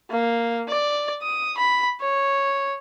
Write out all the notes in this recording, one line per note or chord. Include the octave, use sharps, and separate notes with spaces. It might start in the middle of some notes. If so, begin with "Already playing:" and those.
A#3
D5
D#6
B5
C#5